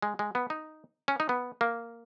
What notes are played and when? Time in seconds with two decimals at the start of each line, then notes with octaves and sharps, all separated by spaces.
0.02 G#3
0.19 G#3
0.35 B3
0.50 D#4
1.08 C#4
1.20 D#4
1.29 B3
1.61 A#3